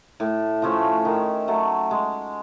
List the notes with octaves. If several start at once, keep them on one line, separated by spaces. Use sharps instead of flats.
A2
F3 A3 C#4
D#3
F#3 A3
G#3